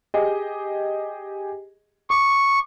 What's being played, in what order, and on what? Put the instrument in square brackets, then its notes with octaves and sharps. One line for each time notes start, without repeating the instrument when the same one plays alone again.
[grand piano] G4 G#4 D#5
[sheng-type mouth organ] C#6 [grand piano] D6